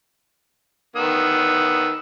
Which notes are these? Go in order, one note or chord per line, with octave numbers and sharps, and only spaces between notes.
D#3 B3 E6